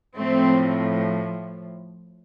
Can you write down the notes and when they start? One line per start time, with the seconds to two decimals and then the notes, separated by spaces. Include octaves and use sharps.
0.17 A2 F3 A3 C4